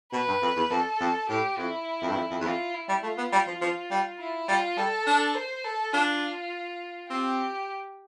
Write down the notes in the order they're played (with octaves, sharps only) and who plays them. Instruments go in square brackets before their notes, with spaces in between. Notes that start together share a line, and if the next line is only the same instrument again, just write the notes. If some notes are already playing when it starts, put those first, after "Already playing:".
[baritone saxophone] B2 [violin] B4
[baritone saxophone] G2
F2
E2
[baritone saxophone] F2 [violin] A4
[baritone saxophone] F2
[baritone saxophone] A2 [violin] G4
[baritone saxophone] F2 [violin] E4
[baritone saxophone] F2
G2
F2
F2
E2
[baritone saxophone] F2 [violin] F4
[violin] E4
[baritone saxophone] G3
[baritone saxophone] A3 [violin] F4
[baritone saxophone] B3
G3
F3
F3
G3
[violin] E4
[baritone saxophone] G3 [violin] F4
[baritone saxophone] G3 [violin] A4
[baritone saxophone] D4
[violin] C5
A4
[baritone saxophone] D4 [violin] F4
[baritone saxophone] C4 [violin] G4